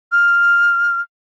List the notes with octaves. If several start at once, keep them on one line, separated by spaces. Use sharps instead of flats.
F6